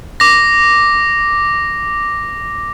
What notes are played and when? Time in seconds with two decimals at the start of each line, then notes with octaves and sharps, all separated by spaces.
0.20 D6 A#6